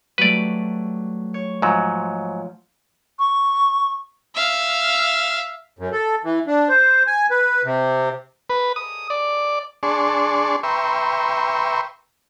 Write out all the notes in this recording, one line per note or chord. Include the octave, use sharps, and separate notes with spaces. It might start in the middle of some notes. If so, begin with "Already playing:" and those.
F#3 G3 A3 B4 D5
C#5
G#2 F3 F#3
C#6
E5 F5
F#2
A4
E3
D4
C5
G#5
B4
C3
B4
D#6
D5
D4 G#4 D5 A5 C6 C#6
B4 E5 G5 A#5 C6 C#6